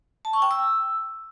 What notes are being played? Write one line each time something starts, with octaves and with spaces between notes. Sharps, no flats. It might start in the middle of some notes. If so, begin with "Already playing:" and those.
A5
C#6
G5
E6